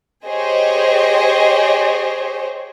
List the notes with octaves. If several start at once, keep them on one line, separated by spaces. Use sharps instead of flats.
G4 G#4 C5 C#5 D#5